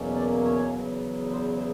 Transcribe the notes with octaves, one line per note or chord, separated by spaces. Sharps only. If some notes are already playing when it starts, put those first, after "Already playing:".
Already playing: E2 B2 F#3 A#3 C#4
D5
C#5
E2 C#3 F#3 B3
C5
C5